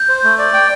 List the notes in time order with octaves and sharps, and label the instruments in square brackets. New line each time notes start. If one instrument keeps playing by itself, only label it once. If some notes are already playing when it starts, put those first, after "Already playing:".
Already playing: [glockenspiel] G6
[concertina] C5
A3
D5
G5